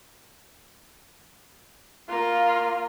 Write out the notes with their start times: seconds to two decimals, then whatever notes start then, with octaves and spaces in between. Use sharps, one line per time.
2.09 A#3 F4